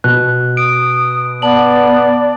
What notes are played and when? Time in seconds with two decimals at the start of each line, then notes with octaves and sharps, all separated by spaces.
0.04 B2 F#6
0.57 D#6 D7
1.42 B3 D5 A5 F#7